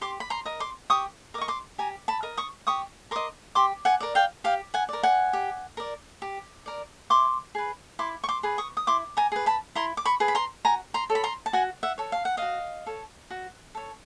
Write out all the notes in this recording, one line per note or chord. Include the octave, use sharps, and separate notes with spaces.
G4 C6 D6
B5
A#5 C6
A#4 D#5
C6 D6
G4 C#6 D#6
A#4 D#5 C#6 D6
C6 D6
G4 G#5 A#5
A5 B5
A#4 D#5
C#6 D#6
G4 C#6 D#6
A#4 D#5 C6 D6
G4 C6 D6
F#5 G#5
A#4 D5
F5 G5
G4 F5 G5
F#5 G#5
A#4 D5
F#5 G#5
G4
A#4 D5
G4
A#4 D5
E4 C6 D6
G#4 B4
E4 C6 D6
C#6
C6 D6
G#4 B4
C#6 D#6
D#6
E4 C6 D6
G#5 A#5
G#4 B4
A5 B5
E4 A#5 C6
D6
B5 C#6
G#4 B4
B5
A#5 C6
F#4 G#5 A#5
A#5 C6
A4 C#5
B5
A#5 C6
A5
F#4 F#5 G#5
E5 F#5
A4 C#5
F5
F#5
F#4 D#5 F5
A4 C#5
F#4
A4 C#5